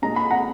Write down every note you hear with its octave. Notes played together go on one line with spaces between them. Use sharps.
A#2 G#3 A#5
B5
F#5 A#5